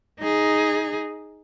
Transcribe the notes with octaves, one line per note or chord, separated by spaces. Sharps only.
D#4 G#4